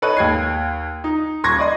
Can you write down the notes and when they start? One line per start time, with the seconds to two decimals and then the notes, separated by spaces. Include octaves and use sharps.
0.02 A4 B4 C#5 D#5
0.17 D#2 G#6 C7
1.04 D#4
1.44 D#1 C6 C#6 G#6 A#6
1.59 D5 D#5 C6